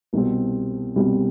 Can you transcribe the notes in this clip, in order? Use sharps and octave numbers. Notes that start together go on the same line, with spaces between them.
C2 B2 G3 C4
C2 B2 G3 C4